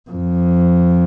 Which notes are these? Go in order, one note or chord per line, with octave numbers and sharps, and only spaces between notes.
F2